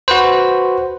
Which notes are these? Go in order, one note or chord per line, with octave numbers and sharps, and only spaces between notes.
F#4 B4 C5